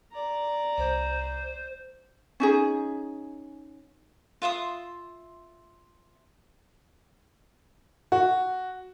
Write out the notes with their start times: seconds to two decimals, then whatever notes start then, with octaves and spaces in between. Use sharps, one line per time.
0.12 D5 A#5
0.78 C2 C5
2.40 C#4 D#4 G#4
4.42 F4 E5 C6 D#6
8.12 F#4